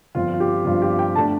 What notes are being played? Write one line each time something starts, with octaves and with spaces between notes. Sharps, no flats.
G1 G2 F3 C4 F4
F4
G4
G1 G2 F3 C4 F4
G4
G5
D3 A3 D4 A5